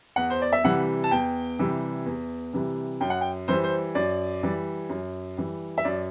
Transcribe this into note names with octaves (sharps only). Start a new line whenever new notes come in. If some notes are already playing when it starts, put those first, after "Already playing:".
E2 F#5
C5
D5
E5
C3 E3 G3 F#5
A5
E2 G5
C3 E3 G3
E2
C3 E3 G3
F#2 G5
F#5
G5
E3 G3 C5
C5
F#2 D5
E3 G3
F#2
E3 G3
E5
F#2 D5